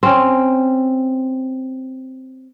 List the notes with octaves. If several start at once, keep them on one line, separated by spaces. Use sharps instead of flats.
C4 C#4